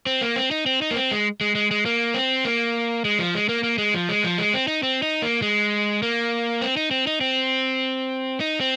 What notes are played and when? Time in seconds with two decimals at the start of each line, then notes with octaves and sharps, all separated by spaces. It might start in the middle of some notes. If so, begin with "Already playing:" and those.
0.06 C4
0.21 A#3
0.36 C4
0.51 D#4
0.66 C4
0.82 D#4
0.91 A#3
0.96 C4
1.11 G#3
1.41 G#3
1.55 G#3
1.71 G#3
1.86 A#3
2.14 C4
2.45 A#3
3.05 G#3
3.19 F3
3.35 G#3
3.49 A#3
3.63 A#3
3.78 G#3
3.94 F3
4.09 G#3
4.24 F3
4.38 G#3
4.54 C4
4.68 D#4
4.83 C4
5.02 D#4
5.22 A#3
5.42 G#3
6.03 A#3
6.61 C4
6.77 D#4
6.91 C4
7.07 D#4
7.21 C4
8.41 D#4
8.61 C4